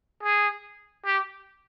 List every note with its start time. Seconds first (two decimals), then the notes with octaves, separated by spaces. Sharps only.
0.23 G#4
1.06 G4